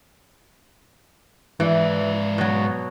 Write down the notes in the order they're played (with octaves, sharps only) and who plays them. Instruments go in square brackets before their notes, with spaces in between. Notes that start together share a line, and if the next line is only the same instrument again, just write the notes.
[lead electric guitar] G#2 D5 [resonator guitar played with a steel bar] E3
[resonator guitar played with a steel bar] B2 F#3